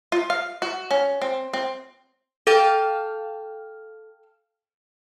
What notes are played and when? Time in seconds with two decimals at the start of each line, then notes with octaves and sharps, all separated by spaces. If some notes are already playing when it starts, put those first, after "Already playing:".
0.12 F4
0.30 F5
0.62 F#4
0.91 C#4
1.22 C4
1.53 C4
2.47 A4 F5 G5 A5